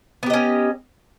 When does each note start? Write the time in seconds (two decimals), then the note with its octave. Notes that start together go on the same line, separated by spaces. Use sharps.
0.23 B3
0.26 G4
0.30 D#5
0.33 C#4